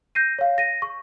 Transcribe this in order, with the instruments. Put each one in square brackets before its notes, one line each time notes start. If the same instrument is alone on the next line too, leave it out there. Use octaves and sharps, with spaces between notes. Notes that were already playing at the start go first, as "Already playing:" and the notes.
[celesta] G6 A#6 C7 D#7
C#5 F5
A#6 D#7
C#6